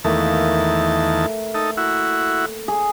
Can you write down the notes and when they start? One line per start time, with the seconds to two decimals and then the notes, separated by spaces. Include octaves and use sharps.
0.04 E2 D#3 A3 A#3 A5
1.55 D#4 A4
1.77 E4 F#4
2.68 G#4